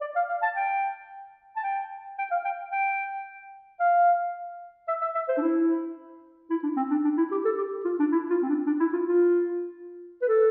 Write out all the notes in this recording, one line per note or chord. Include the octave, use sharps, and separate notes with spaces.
D5
F5
F5
A5
G5
A5
G5
G5
F5
G5
G5
F5
E5
E5
E5
C5
D4
E4
E4
D4
C4
D4
D4
E4
G4
A4
G4
F4
D4
E4
F4
C4
D4
D4
E4
F4
F4
B4
A4